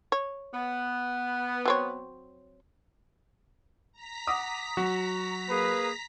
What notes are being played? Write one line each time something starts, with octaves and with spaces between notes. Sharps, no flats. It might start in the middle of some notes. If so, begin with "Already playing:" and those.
C#5
B3
F#3 C4 C#5
A#5 B6
F#5 D6 D#6
F#3 F#4
A#3 G#4 B4